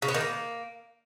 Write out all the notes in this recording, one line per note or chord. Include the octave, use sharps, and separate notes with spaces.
C#3
B3
D#3
A#3